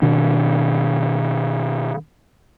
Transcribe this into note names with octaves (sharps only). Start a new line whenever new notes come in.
B2 D#3 D4